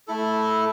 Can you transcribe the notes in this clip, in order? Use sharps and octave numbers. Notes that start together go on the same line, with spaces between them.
A3 E4 A4